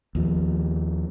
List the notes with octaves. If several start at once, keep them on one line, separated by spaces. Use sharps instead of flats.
D#2 F3